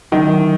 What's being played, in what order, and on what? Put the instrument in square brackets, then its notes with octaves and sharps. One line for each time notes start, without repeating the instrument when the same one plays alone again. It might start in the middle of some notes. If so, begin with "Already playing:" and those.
[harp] D3 F#3 A3 C#4 [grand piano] D#3